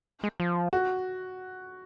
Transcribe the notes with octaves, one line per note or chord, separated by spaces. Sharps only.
G#3
F3
F#4